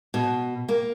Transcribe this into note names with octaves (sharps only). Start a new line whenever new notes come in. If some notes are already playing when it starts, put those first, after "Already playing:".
B2
A#3